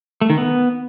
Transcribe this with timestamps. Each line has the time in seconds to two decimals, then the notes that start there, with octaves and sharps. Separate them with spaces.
0.21 A3
0.30 D#3
0.38 B3